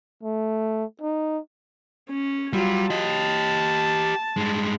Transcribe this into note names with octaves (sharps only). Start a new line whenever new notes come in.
A3
D#4
C#4
F#3 G3 F4
G4 D#5 A5
G2 G#3